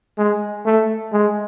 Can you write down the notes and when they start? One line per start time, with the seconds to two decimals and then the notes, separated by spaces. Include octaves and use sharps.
0.18 G#3
0.66 A3
1.13 G#3